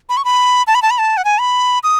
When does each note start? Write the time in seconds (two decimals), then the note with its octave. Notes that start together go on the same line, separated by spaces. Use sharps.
0.09 B5
0.17 C#6
0.25 B5
0.67 A5
0.75 B5
0.82 A5
0.91 B5
0.98 A5
1.17 F#5
1.25 G#5
1.40 B5
1.83 D#6